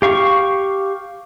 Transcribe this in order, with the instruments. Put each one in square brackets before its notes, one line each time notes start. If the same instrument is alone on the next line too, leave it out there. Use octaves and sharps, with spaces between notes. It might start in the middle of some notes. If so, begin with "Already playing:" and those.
[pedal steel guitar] G4 F5 C#6